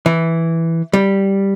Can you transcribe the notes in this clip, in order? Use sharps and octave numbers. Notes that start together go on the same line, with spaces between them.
E3
G3